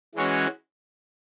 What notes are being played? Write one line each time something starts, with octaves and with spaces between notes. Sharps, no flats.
E3 G#3 C#4 F#4 C#5